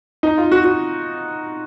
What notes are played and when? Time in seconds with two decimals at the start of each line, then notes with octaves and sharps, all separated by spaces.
0.23 D#4
0.38 F4
0.52 F#4
0.64 F#4